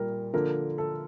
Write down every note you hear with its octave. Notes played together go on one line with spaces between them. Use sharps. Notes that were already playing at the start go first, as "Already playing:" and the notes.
Already playing: A#2 G3 A#4
D3 F3 A#3 A#4
A4